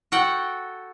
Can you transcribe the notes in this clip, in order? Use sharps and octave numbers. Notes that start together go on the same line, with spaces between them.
F#4 A4 F#5 G5